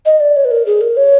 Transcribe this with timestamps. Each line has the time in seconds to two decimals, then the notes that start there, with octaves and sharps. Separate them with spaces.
0.06 D#5
0.20 D5
0.36 C#5
0.45 B4
0.51 A#4
0.66 G#4
0.81 A#4
0.97 C#5